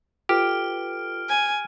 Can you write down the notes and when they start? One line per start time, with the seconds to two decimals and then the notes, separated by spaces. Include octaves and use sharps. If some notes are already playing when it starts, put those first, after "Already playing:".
0.29 F4 G4 A4 B4 F6 D7
1.29 G#5